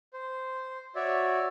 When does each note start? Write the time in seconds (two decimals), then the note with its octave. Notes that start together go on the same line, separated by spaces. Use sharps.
0.13 C5
0.95 F#4 C#5 D5 E5